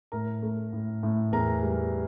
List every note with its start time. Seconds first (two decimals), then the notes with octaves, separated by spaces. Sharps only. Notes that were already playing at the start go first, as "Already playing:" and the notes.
0.12 A2 A#4 A#5
0.42 A3
0.73 A2
1.03 A2
1.32 E2 A#4 A#5
1.63 G3